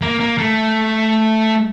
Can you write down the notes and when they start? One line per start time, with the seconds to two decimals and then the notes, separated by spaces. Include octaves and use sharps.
0.02 A#3
0.20 A#3
0.38 A3